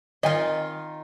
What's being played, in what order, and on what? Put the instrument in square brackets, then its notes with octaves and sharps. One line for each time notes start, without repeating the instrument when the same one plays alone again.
[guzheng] D#3 F4 [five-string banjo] D#5 G#5